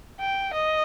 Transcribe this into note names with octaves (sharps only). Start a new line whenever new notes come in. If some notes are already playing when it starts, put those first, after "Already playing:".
G5
D#5